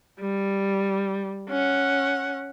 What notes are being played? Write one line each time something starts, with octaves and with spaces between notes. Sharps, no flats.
G3
C#4 F#5